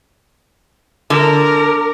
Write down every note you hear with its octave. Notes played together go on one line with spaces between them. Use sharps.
D3 A#4